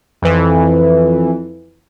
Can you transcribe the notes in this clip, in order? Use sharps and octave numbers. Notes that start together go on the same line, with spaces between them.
F2 E3